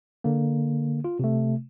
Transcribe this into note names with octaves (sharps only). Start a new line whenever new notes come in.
D3 A#3
F4
C3 A3